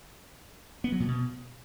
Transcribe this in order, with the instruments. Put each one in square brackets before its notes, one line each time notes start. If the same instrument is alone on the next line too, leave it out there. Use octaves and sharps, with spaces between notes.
[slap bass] B3
F#3
A#2
B2